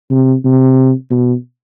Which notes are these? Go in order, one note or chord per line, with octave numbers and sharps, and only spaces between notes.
C3
C3
B2